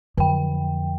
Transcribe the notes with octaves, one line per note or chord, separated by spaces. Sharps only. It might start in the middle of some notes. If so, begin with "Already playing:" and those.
F2 D3 G5